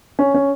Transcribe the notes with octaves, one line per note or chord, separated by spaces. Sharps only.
C#4
C#4